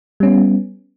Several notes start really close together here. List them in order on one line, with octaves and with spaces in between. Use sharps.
G3 C#4 B3